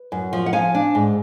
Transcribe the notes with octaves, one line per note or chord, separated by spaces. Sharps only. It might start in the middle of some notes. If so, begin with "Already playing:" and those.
Already playing: B4
F#2
F3
F#5
F3 F5 G#5
D4
G#2